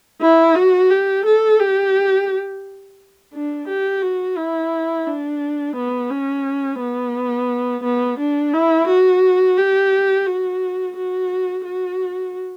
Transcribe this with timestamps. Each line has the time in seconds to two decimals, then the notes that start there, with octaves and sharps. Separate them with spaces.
0.21 E4
0.55 F#4
0.90 G4
1.26 A4
1.59 G4
3.34 D4
3.68 G4
4.02 F#4
4.37 E4
5.07 D4
5.76 B3
6.11 C#4
6.79 B3
7.84 B3
8.19 D4
8.53 E4
8.88 F#4
9.57 G4
10.26 F#4
10.97 F#4
11.65 F#4